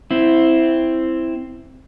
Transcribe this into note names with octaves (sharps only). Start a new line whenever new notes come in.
C4 E4